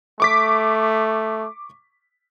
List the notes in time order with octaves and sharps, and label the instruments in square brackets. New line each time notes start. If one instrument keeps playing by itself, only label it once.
[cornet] A3 [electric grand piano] C#6 D6 B6